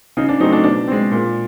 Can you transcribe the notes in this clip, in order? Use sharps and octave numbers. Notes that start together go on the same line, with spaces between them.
C#3 D#4
D4
F#3 A3 C4 D#4
D4
B2 D4
G#3 C4
A#2